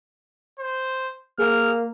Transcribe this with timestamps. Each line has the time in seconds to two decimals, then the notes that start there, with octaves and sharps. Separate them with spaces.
0.59 C5
1.39 A#3 G#4 F6